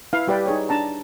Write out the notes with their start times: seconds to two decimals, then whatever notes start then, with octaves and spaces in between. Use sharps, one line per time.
0.13 E4 B4 F5
0.27 G3 G4 B4 D5 G5
0.46 D#4 G#4 C#5
0.69 D4 A5 A#5